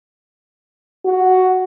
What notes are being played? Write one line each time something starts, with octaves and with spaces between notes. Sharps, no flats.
F#4